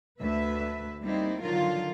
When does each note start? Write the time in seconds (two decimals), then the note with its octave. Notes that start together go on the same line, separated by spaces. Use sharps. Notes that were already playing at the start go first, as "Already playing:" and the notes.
0.21 D2 B4 E5
1.03 G3 A#3 C4 D#4 E4
1.42 D3 D#3 F3 F#3 F4 A#4